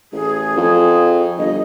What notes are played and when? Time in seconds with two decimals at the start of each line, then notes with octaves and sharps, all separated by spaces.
0.13 A1 G#4
0.57 F2
1.38 G1 D#5